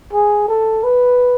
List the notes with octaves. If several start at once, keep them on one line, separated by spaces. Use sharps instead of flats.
G#4
A4
B4